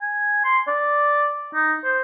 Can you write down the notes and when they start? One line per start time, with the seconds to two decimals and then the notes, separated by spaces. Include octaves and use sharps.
0.02 G#5
0.44 C6
0.68 D5
1.55 D#4
1.84 C5